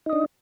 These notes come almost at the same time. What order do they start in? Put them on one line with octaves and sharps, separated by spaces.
D#4 D#5 D4